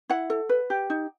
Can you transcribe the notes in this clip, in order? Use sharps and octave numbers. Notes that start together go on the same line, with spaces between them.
E4 F#5
A4
B4
G4
D#4